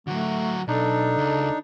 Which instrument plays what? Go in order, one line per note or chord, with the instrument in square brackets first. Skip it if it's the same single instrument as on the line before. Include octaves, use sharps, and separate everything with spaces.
[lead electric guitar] D3 F#3 [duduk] A3 [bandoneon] F#4
[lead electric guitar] B1 [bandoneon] D4 D#4 [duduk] A4
[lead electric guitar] C#2